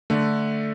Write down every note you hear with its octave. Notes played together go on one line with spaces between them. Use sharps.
D3 A3